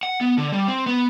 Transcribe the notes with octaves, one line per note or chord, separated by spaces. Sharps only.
F#5
B3
D3
G3
C4
B3